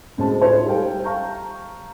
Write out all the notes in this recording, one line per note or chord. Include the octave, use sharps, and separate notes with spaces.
D2 A2 G#3 C4 C#4 A5
D#4 F4 A4 C#5 A5 C6
G3 A4 C5 F5 G5
F5 A5 A#5 C#6 G6